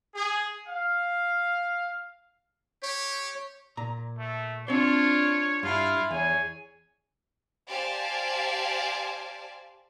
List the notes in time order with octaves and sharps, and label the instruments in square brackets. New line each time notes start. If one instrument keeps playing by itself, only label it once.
[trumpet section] G#4
F5
[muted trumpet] G4 [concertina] C#5
[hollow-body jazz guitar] A#2 A#5
[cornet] A3
[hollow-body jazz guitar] C4 C5 [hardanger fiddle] D4 F4 [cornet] C#5
[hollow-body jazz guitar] G2 [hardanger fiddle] E4 F5 [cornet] F4
[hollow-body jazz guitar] E2 [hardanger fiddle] G#4 C#5 [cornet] G#5
[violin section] G4 C5 D5 F5 G#5 A5